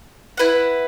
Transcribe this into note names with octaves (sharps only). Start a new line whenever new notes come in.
E4 B4 F#5